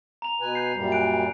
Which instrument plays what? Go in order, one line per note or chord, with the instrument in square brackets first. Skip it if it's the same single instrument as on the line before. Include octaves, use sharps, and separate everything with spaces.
[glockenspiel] A#5 F7
[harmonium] B2 B4 G#5
[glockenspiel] G6 C7
[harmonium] F#2 A#2 G3
[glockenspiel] G#5 F#6 D7